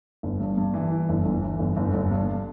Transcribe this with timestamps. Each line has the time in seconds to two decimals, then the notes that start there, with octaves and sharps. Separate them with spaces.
0.23 G1
0.40 G2
0.57 G2
0.74 E3
0.91 E3
1.09 G1
1.25 G1
1.43 E3
1.59 G1
1.77 G1
1.94 G1
2.11 G2